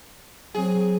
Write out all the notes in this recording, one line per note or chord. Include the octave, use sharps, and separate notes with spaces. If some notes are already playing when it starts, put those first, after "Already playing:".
F#3 C4 G#4